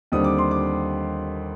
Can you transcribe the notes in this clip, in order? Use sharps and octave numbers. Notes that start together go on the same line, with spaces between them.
D#2 D3 G3 C4 D#6
D6
C6
D6